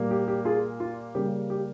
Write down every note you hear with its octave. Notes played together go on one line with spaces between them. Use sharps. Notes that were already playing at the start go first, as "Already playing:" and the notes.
Already playing: A#2 G3 A#3
G4
G4
F4 G#4
F4
C#3 G3 A#3 G4
G4